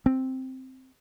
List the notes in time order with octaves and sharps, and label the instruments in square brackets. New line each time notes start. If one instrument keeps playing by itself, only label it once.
[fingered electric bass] C4